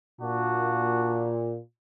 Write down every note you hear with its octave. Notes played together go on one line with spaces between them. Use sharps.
A#2 D4 F#4